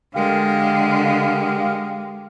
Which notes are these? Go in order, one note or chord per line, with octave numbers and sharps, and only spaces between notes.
D3 G#3 G4 A#4 F5